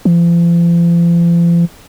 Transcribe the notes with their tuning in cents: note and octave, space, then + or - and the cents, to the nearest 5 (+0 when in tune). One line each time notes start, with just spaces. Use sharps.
F3 -40